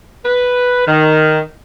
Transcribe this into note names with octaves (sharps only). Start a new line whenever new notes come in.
B4
D#3